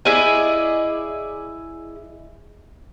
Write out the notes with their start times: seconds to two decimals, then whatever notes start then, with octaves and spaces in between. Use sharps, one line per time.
0.05 E4 G#4 D5 D#5